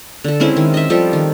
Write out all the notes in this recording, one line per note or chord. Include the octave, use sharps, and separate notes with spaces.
D3 A4
G#3 C4 C#4 E4
D#3
D#5 E5
F3 G3 G4 A4
D#3